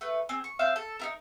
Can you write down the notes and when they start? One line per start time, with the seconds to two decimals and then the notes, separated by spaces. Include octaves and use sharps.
0.01 A3 B4
0.29 C4 G#4
0.44 C#6
0.59 C4 E5 F5 G6
0.76 A4
0.99 D#4 E4 A#4